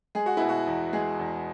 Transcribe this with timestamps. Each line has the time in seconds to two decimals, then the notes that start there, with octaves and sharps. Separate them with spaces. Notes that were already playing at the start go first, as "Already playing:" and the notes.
0.15 G#3 G#4
0.26 F#4
0.37 B2 E4
0.49 F#4
0.67 E2
0.93 G#3 G#4
1.19 E2